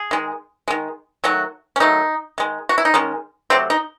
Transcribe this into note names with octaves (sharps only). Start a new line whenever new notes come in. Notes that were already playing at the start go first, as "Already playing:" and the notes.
Already playing: G#4
D#3 G#3
D#3 G#3
D#3 F#3 A3 F#4
C#4
D#3 F#3 A3 D#4
D#3 G#3
F#4
E4
D#4
D#3 G#3 C#4
C3 F#3 A3 C4
D#4